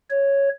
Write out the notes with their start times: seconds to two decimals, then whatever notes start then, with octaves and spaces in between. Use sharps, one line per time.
0.11 C#5